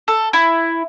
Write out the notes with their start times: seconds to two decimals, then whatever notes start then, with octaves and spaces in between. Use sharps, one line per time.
0.08 A4
0.33 E4